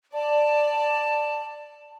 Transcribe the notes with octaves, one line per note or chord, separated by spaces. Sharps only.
D5 A5